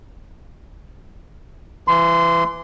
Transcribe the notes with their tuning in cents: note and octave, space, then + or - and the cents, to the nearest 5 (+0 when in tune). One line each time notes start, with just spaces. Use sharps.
E3 +25 C6 -20